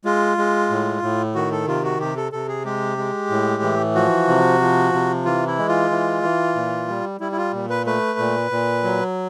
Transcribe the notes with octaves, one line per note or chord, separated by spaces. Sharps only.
G#3 F4
G#3
A2
A2
D#3 F#4
A4
C3 F4
F#4
C3 G4
A4
C3 A4
G#4
G#3 G4
G#3
A2
E3
F3 F#4
C3
F3
C3
E3 F4
E4
G#3
F4
E3
E3
A#2
G3
G3 E4
E4
F4
A#2
B4
A3 B4
A#2
A#2
F#3